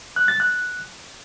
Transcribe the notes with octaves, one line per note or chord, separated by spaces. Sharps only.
F#6
A6
F#6